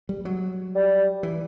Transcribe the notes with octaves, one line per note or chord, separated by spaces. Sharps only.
G3
F#3
G3
E3